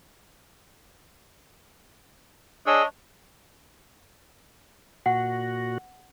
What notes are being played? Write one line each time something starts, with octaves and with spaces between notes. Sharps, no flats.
D4 G#4 C#5 D#5 E6
A#2 F#4 F#5